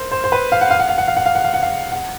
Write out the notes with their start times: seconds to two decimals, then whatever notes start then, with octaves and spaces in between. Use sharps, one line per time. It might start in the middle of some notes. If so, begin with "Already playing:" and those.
Already playing: A#4 C5
0.12 C5
0.24 C5
0.32 B4
0.52 F5
0.61 F#5
0.70 F5
0.79 F#5
0.89 F5
0.98 F#5
1.08 F5
1.17 F#5
1.26 F5
1.35 F#5
1.44 F5
1.54 F#5
1.63 F5
1.92 F#5